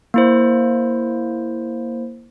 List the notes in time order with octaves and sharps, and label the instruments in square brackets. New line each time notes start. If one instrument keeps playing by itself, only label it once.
[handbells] A#3 E4 C5